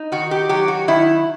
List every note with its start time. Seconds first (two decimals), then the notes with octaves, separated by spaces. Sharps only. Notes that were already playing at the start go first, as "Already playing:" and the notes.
Already playing: D#4
0.12 D#3 F#4
0.31 G4
0.49 F#3 G4
0.68 F#4
0.88 D#3 E4